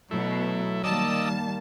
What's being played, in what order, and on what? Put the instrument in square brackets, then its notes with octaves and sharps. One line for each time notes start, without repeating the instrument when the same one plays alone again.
[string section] B2 [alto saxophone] F#3 [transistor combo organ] A3 E4
[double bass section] D#3 G3 A#3 [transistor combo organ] D5 D#5 E6 [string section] A5